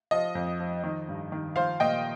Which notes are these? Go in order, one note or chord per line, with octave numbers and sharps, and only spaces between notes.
F3 D#5
F2
F3
D#3
G2
D#3
F3 C5 F5
A#2 D#5 G5